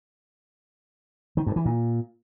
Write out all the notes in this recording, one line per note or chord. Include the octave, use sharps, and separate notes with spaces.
D#3
G2
E3
A#2